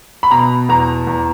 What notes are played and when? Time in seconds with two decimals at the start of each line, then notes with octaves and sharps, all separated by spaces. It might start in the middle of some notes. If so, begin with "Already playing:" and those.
0.23 B5
0.31 B2 A#5
0.69 E2 A#5
1.07 E2